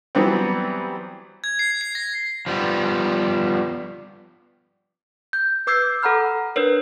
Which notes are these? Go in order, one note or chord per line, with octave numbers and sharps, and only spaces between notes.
E3 F#3 G3 B3 C4
G#6
C7
C7
A#6
F3 G3 B3
G6
B4 D6 E6 G6 G#6 C7
A4 F#5 A#5 B5 F6
D4 A#4 B4 C#5